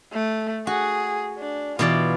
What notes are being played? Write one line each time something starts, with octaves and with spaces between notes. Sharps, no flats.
A3
F#4 G#4
D4
B2 E3 F4 D5